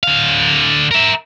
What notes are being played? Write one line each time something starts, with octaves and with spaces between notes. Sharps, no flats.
D3 F5
A#4 E5